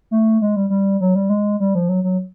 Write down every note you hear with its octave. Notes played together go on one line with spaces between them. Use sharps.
A3
G#3
G3
G3
F#3
G3
G#3
G3
F3
F#3
F#3